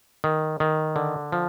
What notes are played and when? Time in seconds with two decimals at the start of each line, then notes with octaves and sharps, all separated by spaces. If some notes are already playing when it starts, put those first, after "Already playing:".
0.24 D#3
0.60 D#3
0.96 D3
1.32 F3